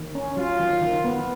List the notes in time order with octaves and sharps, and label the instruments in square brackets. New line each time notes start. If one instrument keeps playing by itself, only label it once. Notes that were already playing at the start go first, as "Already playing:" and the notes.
Already playing: [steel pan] D#3
C#4
[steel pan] F#3 [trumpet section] F4
[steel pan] D#3
D#3
B3